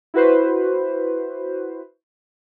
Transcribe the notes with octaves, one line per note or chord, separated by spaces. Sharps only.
E4 F#4 B4 C5